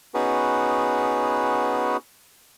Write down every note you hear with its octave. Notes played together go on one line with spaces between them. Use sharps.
B3 C#4 D#4 F#4 G#4 B4